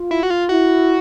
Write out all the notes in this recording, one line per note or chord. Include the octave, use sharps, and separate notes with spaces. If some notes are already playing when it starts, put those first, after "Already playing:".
Already playing: F4
E4
F#4
F4
E4 F#4